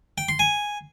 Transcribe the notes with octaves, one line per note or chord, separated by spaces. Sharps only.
G5
C6
G#5